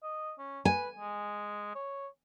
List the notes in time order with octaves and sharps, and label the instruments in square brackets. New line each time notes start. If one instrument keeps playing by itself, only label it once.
[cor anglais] D#5
C#4
[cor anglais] B4 [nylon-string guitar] G#5
[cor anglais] G#3
C#5